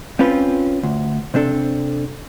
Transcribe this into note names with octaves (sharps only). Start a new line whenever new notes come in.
C4 C#4 F4 B4
D2
C3 C4 D4 A4